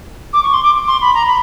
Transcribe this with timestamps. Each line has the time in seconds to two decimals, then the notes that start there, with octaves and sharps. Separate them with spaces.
0.33 D6
0.43 C#6
0.53 C6
0.63 D6
0.87 C6
1.01 B5
1.14 A#5
1.26 B5